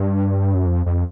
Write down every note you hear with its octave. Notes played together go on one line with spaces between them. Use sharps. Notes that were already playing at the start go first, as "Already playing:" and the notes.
Already playing: G2
F#2
F2
F2